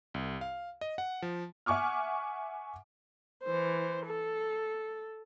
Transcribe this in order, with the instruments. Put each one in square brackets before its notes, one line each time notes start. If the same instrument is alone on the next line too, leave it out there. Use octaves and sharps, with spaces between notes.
[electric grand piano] C2
F5
D#5
F#5
F3
[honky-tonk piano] E5 F#5 G#5 C#6 D6 F6
[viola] E3 C5
A4